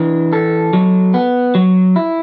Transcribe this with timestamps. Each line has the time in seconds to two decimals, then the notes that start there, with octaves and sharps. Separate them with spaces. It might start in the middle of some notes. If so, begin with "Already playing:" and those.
Already playing: E3 D4
0.33 A4
0.73 F#3
1.14 B3
1.55 F#3
1.96 E4